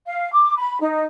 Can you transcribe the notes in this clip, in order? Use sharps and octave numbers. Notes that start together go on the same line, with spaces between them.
F5
D6
B5
D#4